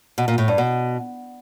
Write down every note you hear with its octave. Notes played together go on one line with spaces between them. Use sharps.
B2
A#2
A2
G2
B2